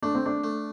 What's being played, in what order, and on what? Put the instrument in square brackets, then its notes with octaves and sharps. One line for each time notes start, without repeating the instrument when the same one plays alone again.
[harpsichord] A3 [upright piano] D4
[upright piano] C4
D4
[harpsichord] A3